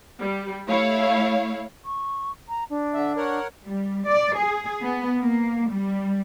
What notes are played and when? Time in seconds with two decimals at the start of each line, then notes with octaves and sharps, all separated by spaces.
0.20 G3
0.68 A3 E4 C#5 F5
1.85 C#6
2.49 A#5
2.70 D4
2.94 D3 E5
3.17 A#4 C#5 F#5
3.66 G3
4.07 D5
4.37 G#4
4.83 B3
5.19 A#3
5.70 G3